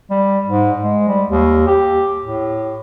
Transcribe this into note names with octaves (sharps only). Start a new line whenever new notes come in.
G3
G#2
G#3
G3
D#2
G4
A2